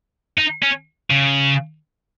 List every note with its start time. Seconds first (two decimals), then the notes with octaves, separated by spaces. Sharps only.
0.38 D#4
0.63 C#4
1.11 C#3